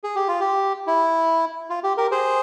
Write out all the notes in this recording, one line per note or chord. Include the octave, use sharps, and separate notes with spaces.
G#4
G4
F4
G4
E4
F4
G4
G4 A#4
G#4 C5